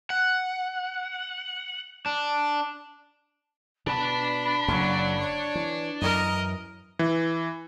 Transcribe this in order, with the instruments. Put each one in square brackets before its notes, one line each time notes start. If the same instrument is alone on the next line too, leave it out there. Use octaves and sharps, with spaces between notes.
[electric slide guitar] F#5
D4
[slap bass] B2 [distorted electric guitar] D4 A5 [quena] B5
[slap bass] F#1 C#3 A#3 [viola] F#3
[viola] C#5
[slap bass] E3
[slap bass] F#2 E3 [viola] A#4 D#5 [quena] A#5
[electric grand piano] E3